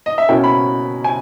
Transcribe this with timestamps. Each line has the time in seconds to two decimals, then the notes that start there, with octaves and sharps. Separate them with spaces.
0.06 D#5
0.18 E5
0.29 B2 A#3 C#4 E4 G5
0.44 B5
1.04 G#5